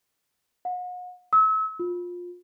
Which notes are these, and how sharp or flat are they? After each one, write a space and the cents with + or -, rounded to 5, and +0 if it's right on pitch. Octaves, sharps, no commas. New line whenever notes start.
F#5 -40
E6 -35
F4 +20